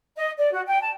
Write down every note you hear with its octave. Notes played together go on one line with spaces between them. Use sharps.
D#5
D5
F#4
G5
A5